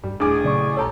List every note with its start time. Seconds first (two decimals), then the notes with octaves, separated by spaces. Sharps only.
0.03 G2 G3
0.20 D#1 A1 D4 G#4 D6
0.44 A#2 C#3 F#3 A3 D5 C#6
0.77 D#1 A#1 C#4 G4 A4 C#5 A5 A#5